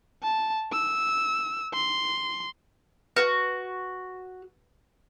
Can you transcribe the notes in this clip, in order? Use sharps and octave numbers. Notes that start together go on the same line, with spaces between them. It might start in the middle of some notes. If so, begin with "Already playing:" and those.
A5
E6
C6
F#4 B4